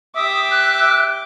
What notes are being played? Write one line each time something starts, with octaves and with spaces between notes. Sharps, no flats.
G4 E5 D6 D#6
F#6